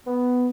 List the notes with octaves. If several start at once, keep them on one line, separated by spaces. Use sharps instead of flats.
B3